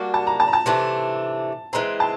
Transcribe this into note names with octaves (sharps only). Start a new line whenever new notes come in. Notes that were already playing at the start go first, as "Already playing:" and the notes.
Already playing: G3 A#3 D4 F#4
A5
A#5
A5
A#5
A5
C3 E3 A3 D4
E3 G#3 C4 A#5
A5